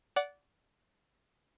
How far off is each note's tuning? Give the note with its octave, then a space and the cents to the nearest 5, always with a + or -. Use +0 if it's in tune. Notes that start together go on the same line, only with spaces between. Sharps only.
D5 -20 F#5 +0